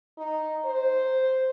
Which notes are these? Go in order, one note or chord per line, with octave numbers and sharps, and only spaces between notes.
D#4
C5